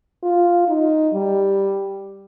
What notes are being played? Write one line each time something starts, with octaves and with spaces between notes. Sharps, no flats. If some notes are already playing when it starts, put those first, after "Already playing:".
F4
D#4
G3